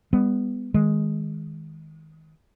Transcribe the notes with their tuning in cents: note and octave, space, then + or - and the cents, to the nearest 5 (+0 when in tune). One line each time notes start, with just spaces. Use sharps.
G3 +40 B3 +5
D#3 +25 G#3 +0